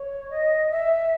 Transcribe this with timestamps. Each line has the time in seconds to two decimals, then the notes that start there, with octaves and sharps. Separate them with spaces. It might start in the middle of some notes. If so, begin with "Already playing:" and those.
Already playing: C#5
0.30 D#5
0.70 E5